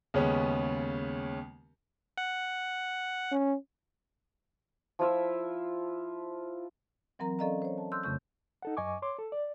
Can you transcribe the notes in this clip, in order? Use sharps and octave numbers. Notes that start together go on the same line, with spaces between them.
D#2 C#3 G#3 B3 C#4
F#5
C#4
F3 E4 F4 E5
E3 F#3 C4 A#4 A#5
C#4 A4 D5 D#5 F5 A#5
C5 C#5
A5
C6 E6 F#6 G6
F2 C#3 A3 C#6 G6
D#4 A4 F#5
F#2 D#5 G#5 C#6 D6
C#5 C6 D6
A4
D5